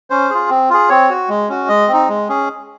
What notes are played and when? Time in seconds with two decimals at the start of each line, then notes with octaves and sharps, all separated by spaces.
0.10 C#4 C5
0.30 F4 G#4
0.50 C4
0.70 F4 G#4
0.89 C4 C#5
1.10 F#4
1.29 G#3
1.49 C#4 F#4
1.68 G#3 D#5
1.88 C4
1.93 D#4
2.09 G#3
2.29 C#4 G#4